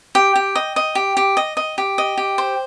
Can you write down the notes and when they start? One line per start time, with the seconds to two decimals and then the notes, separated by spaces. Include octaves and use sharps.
0.15 G4 G5
0.36 G4
0.55 D#5
0.76 D#5
0.95 G4
1.17 G4
1.37 D#5
1.57 D#5
1.78 G4
1.98 D#5
2.17 G4
2.38 C5